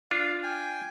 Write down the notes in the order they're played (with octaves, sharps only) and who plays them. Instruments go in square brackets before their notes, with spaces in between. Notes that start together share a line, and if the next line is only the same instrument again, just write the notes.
[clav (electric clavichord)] D4 F4 [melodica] F5
[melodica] G5 G#5